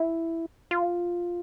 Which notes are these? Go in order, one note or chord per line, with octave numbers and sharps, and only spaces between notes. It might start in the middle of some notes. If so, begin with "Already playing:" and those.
Already playing: E4
F4